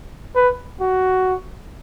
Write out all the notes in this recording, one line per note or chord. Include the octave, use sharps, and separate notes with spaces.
B4
F#4